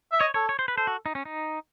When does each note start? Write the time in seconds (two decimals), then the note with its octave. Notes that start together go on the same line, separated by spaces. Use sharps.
0.12 E5
0.21 C#5 D#5
0.34 A4 C#5
0.49 C#5
0.59 C5
0.68 B4
0.77 A4 C5
0.87 F#4
1.06 D#4
1.15 C#4
1.25 D#4